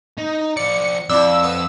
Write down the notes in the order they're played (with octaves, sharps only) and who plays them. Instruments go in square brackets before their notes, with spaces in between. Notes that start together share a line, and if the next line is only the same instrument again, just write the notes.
[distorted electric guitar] D#4
[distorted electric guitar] F3 D5 [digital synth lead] C#7
[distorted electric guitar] F2 [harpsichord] D4 E4 [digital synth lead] E6
[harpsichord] B3